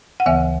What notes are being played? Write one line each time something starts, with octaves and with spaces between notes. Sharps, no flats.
F#5
D2 C#3 E3 B3 E5 G#5